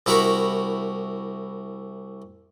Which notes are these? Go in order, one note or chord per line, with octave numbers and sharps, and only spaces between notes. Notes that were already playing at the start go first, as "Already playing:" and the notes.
C2 E4 F#4 A#4 B5 C#6